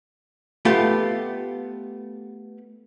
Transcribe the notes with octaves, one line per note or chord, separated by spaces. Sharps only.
A3 B3 F4 G4